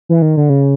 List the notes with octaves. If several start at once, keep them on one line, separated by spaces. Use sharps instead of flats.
E3
D#3
D3
C#3